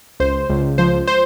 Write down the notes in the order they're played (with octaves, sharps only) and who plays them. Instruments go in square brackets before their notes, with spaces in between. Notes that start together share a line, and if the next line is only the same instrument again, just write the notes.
[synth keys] C#2 C5
C#2
F3 C5
C5